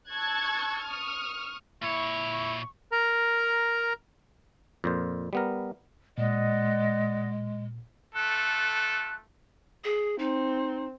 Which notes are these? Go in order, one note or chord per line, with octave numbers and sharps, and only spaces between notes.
A5 C#6 E6 F#6 G#6 A6
C#6 D#6 F6
A#2 E4 C#5 C#6
A#4 A#5
F2 A#2 C5
G3 B3 A#4
A#2 G#3 D5 D#5 F#5
A3 F4 A4 F#6
G#4
C4 D#4